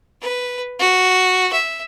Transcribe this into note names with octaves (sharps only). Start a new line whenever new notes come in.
B4
F#4
E5